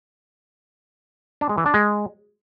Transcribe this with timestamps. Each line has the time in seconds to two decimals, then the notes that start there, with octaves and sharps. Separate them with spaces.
1.41 D4
1.49 G#3
1.58 E3
1.66 D4
1.74 G#3